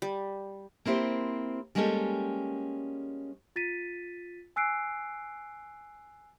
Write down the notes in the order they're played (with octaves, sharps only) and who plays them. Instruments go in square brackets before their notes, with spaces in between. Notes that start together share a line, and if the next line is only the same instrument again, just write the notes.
[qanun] G3
[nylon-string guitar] A#3 C4 E4 G4 C5
G3 G#3 A#3 C#4 G4 A4
[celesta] F4 A6 B6 D#7
G#5 E6 F#6 C7 D7